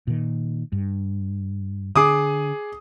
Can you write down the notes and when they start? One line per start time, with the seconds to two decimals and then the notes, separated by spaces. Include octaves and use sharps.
0.07 A#2 D#3
0.72 G2
1.96 D3 G#4 D6 D#6